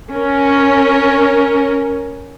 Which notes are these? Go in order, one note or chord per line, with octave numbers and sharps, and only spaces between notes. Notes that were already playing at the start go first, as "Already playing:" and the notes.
C#4 A#4